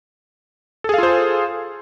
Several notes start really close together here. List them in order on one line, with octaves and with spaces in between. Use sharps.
A4 G#4 F5 F4 C5